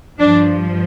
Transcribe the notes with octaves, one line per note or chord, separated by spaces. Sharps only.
G2 F3 D4